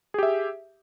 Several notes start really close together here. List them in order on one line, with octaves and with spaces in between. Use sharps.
G#4 G4 E5